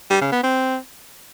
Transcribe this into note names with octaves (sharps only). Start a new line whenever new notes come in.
G3
C#3
B3
C4